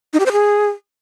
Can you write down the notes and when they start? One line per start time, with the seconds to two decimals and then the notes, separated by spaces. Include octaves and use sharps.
0.13 D#4
0.20 G4
0.26 C5
0.32 G#4